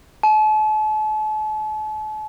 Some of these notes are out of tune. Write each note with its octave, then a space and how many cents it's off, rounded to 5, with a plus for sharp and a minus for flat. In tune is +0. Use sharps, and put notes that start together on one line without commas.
A5 -40